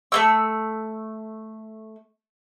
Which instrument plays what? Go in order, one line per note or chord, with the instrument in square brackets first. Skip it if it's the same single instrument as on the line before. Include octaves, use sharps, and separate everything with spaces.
[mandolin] A3 A#3 E6